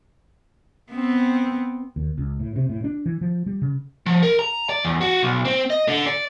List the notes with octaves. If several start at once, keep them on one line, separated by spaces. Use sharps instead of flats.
B3 C4
D#2
C#2
A2
C3
A2
D4
E3
F3
G3
C#3
F3
A#4
A#5
D5
E2
F#4
B1
C4
D#5
D3
D5